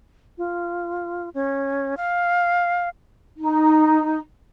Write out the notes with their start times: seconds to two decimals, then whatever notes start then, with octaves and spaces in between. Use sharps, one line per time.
0.38 F4
1.34 C#4
1.97 F5
3.37 D#4